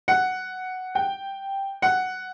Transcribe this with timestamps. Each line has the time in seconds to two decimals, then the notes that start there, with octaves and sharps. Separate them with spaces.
0.08 F#5
0.95 G5
1.82 F#5